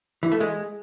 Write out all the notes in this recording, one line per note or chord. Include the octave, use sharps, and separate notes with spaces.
E3
A3
G#3